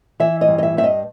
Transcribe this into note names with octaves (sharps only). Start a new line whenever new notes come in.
E3 E5
D#5
G2
D#5
E5
G2 E5
D#5